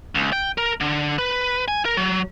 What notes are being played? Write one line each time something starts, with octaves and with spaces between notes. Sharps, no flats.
C#2
G5
A#4
D3
B4
G#5
A#4
F#3